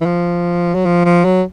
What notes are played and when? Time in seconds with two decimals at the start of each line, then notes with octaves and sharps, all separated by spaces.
0.01 E3
0.06 F3
0.74 F#3
0.85 F3
1.05 F3
1.24 F#3